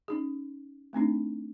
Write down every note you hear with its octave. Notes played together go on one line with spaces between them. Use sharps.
C#4 D#4 G#4
A3 C4 D4 D#4